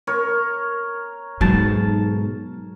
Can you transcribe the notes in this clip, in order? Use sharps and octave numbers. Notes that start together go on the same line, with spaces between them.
A#4 C#5
B1 G#2 F#3 A5